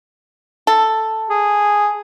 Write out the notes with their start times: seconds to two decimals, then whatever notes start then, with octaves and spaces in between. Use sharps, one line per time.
0.67 A4
1.30 G#4